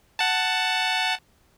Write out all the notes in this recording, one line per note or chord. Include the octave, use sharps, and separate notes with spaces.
F#5 A5